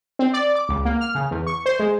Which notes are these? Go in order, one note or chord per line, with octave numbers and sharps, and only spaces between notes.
C4
D5
D6
C#2
A#3
F6
C#3
E2
C#6
C5
G#3